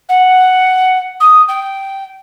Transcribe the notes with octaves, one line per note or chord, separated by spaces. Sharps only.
F#5
D#6
G5